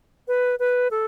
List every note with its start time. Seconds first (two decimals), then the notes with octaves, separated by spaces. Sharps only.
0.28 B4
0.59 B4
0.91 A4